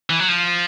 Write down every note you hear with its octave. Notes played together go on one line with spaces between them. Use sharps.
E3
F#3
F3